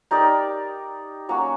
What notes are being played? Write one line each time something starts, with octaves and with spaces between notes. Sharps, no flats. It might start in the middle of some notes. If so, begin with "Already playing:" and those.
D#4 G4 A#4 D5
F#3 A#3 C#4 F#4